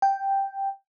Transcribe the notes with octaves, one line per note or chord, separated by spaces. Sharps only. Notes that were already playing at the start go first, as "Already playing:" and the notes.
G5